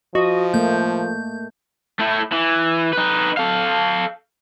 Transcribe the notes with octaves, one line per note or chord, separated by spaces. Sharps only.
F3 F#4 D#5
A3 A#3 G6
A3 E4
E3
D#4 B4
A4 F5